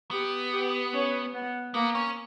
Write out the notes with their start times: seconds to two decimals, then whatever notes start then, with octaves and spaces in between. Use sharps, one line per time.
0.11 B3 G4
0.52 G4
0.93 C#4
1.34 B3
1.74 A#3 B3
1.95 C#4